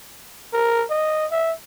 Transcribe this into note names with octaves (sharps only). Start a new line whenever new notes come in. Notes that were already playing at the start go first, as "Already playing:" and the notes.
A#4
D#5
E5